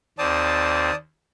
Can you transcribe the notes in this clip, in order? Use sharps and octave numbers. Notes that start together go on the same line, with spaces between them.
D#2 C4 D5 A5 D#6